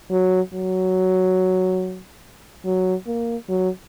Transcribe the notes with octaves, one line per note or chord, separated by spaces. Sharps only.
F#3
F#3
F#3
A#3
F#3